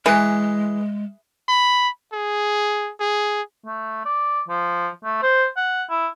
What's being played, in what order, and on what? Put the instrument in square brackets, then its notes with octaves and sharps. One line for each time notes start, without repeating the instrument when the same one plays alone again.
[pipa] E3 [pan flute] G#3 [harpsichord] G#4 B4
[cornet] B5
G#4
G#4
[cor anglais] A3
D5
F3
A3
C5
F#5
E4